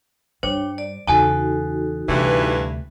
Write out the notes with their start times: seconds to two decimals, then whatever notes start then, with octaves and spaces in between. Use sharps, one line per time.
0.43 G2 G3 D4 C5 C#5 G5
0.78 D5
1.07 E2 C#3 D#4 F#4 A4 G#5 A5
2.09 D2 G2 C3 E3